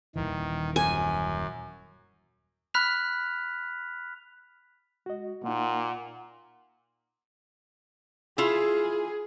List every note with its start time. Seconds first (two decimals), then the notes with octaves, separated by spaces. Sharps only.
0.16 D#1 B1 D#3 E3
0.76 F#2 G#5
2.74 B5 F6 F#6 B6 F7
5.06 G#3 F#4 D#5
5.44 A#2 A#3 D#4 F#5
8.38 E4 F4 G#4